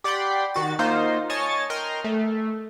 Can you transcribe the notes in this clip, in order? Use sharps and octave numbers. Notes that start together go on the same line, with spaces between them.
G4 D5 F#5 G5 B5 C6
D#3 F#4 A6
A#3 D#4 F4 C5
C#5 D#5 G#5 A5 C#6 A6
A#4 D#5 G5 C6 F6
A3